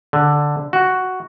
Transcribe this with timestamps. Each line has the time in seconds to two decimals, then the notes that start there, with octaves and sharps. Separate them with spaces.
0.13 D3
0.73 F#4